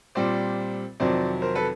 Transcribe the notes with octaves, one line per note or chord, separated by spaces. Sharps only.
A#2 G3 C4 C5 D5
F2 C3 D#3 F#3 C5 D5
A#4 C5
A4 B4